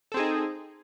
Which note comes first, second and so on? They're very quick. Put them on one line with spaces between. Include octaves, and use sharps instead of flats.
A4 C4 G#4 D#4